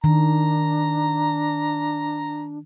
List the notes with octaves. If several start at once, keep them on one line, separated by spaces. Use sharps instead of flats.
D#3 D4 A#5